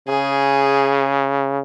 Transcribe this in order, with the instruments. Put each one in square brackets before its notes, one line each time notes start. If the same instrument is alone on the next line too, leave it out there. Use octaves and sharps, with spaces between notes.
[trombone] C#3 [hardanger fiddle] G#4